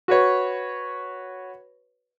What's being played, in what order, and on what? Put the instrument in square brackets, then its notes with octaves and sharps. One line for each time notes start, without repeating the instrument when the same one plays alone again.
[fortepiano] F#4 B4 C#5